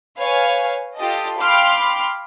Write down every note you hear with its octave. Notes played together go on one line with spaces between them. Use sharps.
B4 C#5 F5 G#5
F4 G4 A4 D#5
F5 G5 B5 C6 D6 F6